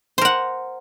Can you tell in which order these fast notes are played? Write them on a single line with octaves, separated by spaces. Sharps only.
C5 A#4 F#5